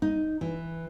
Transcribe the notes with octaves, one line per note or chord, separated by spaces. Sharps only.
D#4
E3